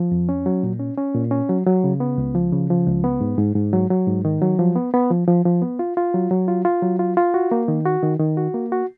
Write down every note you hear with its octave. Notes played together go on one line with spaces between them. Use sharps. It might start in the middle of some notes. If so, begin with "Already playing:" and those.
Already playing: F3
F2
C#4
F#3
A#2
C#4
C#4
A#2
C#4
F#3
F#3
C#3
B3
C#2
F3
C#3
F3
C#2
B3
G#2
G#2
G#2
F#3
F#3
G#2
D#3
F#3
F3
B3
B3
F3
F3
F3
B3
F4
F4
F#3
F#3
F4
F4
F#3
F4
F4
F#4
A#3
D#3
F#4
D#3
D#3
F#4
A#3
F#4